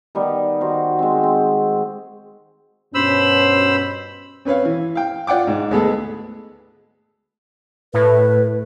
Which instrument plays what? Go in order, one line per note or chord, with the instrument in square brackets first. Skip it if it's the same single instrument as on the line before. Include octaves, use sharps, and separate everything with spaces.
[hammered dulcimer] D#3 G3 B3
D#3 F#4 C5
G#3 C4
C4
[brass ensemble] G2 B2 C#4 [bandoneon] C5 B5 E6
[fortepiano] C4 C#4 B4 C#5 F5
E3
F5 G5
F4 D5 F#5 G5 D6
G#2
D2 G#3 A3 B3 G#4 A4
[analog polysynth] A2 [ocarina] B4